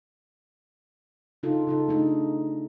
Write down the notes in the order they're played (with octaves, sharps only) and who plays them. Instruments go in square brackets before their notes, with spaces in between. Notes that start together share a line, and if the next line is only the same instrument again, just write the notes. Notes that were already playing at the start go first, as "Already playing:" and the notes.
[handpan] C#3 D#4 F4 A4
C#3 D#4 A4
A3 D4 D#4